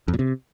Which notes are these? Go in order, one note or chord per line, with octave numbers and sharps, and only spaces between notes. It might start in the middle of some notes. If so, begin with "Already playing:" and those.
F2
A#2
C3